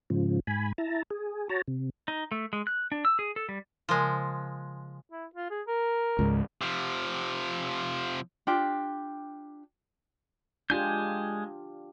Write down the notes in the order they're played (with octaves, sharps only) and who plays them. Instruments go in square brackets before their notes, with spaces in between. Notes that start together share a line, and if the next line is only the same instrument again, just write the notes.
[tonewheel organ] G#2 C#3 F3
G#2 G#5 B5
E4 A5 A#5
G#4
F#4 C#5 A5 A#5
C3
[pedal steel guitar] D#4
A3
G#3
F#6
D4
E6
G#4
A4
G3
[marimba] C#3 A#4 G#5 [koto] F3 G#3
[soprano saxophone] E4
F4
G#4
A#4
[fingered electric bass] C#2 G#2
[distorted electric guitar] C3 F3
[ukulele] D4 F4 G4 G5
[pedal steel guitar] G#3 G#5 G6 [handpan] D4 F4 G4